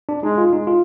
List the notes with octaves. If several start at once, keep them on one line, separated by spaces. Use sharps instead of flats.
D4
G#3 D#4
F4
G#3 D#4
F4